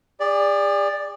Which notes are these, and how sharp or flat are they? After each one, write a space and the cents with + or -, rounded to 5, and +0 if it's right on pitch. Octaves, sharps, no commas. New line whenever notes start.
G#4 -40 D5 +0